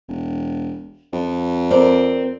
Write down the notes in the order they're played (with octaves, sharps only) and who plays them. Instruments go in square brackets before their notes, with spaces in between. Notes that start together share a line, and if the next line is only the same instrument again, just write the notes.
[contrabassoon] E1
F2
[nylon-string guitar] C4 A#4 D5